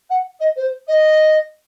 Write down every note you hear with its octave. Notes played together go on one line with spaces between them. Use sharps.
F#5
D#5
C5
D#5